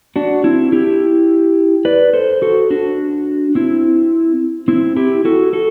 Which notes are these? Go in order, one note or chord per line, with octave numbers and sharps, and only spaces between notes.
D4 F#4
C4 E4
E4 G4
B4 D5
A4 C5
F#4 A4
D4 F#4
C4 E4
C4 E4
E4 G4
F#4 A4
F#4 A4